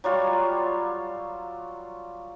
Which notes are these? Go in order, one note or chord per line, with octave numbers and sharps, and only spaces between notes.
F#3 G3 F4 C#5